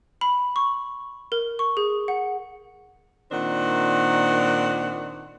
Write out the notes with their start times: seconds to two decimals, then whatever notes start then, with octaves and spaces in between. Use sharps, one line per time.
0.21 B5
0.56 C#6
1.32 A#4
1.59 C#6
1.77 G#4
2.08 F#5
3.32 A#2 D#3 C4 D4 F#5